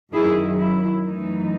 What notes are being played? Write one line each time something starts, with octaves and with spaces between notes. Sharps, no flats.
F#2 D#3 F#3 E4 G#4
E4
F#2 E3 A3 D#4